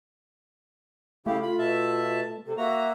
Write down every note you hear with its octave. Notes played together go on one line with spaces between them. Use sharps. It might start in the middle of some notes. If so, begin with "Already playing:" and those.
C#3 A3 E4 G4 F5
F4 B5
B2 E5 A5
C3 A4
A#3 F#4 E5 A#5